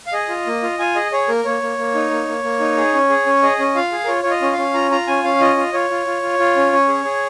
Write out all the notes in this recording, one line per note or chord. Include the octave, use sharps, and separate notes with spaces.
F5
G#4 D#5
F4
A#3
F4
F4 G#5
G#4 D#5
G#4 C#5
A#3 A#4
A#3 C#5
A#3
A#3
D#4
A#3
A#3
A#3
D#4
G#4
C#4
G#4
C#4
G#4 D#5
C#4
F4 F5
G#4
A#4
F4 C#5
F4 C#5
D#5
C#4
C#4 F5
F4 A#5
F4 A#5
C#4 G#5
C#4 F5
F4 D#5
F4
F4 C#5
F4
F4
F4
F4
C#4
C#4
G#4
G#4